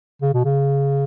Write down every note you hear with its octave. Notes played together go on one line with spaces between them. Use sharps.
C#3
B2
C#3